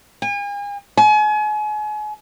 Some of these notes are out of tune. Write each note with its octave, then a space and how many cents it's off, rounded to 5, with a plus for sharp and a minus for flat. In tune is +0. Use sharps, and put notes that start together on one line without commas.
G#5 -40
G#5 +35